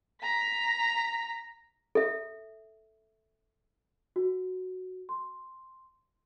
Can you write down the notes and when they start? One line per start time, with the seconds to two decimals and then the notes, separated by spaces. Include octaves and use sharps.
0.23 A#5 B6
1.95 A4 E5
4.16 F#4
5.09 C6